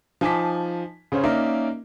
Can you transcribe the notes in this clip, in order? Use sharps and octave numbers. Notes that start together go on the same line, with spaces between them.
F3 D#4 G#5 A5 D6 B6
C#3 C#4 C5 C#5
A#3 C#4 D#4 A#4 D5 E5